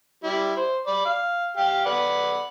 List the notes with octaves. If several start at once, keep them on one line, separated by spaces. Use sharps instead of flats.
G3 E4
C5
D5 B5
F5
G4 F5
B4 D5 F#5